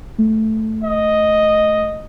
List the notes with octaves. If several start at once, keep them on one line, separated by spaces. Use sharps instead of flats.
A3
D#5